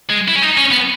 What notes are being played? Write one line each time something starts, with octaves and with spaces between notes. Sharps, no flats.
G#3
E4
C#4
D#4
C#4
B3